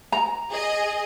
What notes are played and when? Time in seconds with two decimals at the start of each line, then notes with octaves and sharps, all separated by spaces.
0.12 A#5
0.50 G#4 D#5